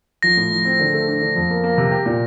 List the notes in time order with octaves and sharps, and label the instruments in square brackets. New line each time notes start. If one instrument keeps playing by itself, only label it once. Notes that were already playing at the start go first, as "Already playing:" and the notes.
[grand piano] F3 [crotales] A#6
[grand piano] A2
F3
C4
D3
A3
D4
D3
F2
A#3
A#3
C3
G4
A#2